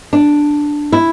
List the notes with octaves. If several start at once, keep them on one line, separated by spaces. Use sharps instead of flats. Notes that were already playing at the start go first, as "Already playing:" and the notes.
D4
E4